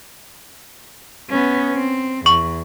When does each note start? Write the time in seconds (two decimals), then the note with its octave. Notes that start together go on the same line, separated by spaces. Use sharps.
1.30 B3 C#4
1.74 C4
2.26 E2 C#6